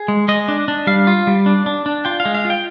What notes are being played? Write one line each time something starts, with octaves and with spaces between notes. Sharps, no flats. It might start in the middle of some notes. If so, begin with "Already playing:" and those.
Already playing: G#4
G#3
G#3 D#5
D4
D4
G3 F5
F4
G3
D4
D4
D4
F4 G5
F5
G#3
F5
F4
G5